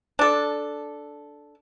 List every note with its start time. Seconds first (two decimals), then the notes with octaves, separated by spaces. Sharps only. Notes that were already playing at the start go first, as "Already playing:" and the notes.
0.19 D4 A4